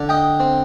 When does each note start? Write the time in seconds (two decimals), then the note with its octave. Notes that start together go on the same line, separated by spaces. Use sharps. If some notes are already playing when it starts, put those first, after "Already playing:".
Already playing: D3
0.09 D#5 G5
0.40 C4